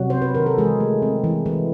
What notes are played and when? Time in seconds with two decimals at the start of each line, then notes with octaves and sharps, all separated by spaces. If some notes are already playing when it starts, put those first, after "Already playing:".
Already playing: C3 F#3 F#4
0.10 C4 C5
0.22 B4
0.35 D#3 A#4
0.46 A4
0.58 E3 G#3 G#4
0.80 A3
1.02 C4
1.24 E3
1.46 E3